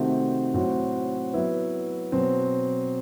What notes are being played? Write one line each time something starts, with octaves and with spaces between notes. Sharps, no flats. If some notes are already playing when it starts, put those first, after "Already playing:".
Already playing: C3 D#3 A3 C4 F#4
A2 F#3 C4 F#4
F#3 B3 E4
B2 F#3 C4